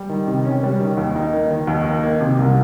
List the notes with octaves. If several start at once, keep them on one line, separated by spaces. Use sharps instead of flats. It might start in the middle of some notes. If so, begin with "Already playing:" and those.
Already playing: G3
D#3
C3
C#4
G3
D#3
D#2
D#4
A#3
D#3
D#2
D#4
A#3
C3
C2